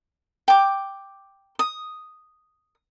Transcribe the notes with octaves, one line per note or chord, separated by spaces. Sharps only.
G5 D6
D#6